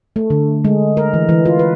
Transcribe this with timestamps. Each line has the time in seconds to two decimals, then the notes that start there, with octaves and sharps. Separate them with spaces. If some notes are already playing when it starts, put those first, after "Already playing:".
0.16 A3
0.30 D3
0.65 G#3
0.97 A#4
1.14 E3
1.29 E3
1.45 F4
1.59 B4